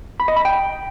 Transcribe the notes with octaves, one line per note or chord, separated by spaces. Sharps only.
B5
D#5
B5
G5